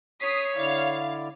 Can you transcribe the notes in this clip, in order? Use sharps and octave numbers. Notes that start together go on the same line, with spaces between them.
C#5 D#6 B6 C7
D3 E4 D5 F5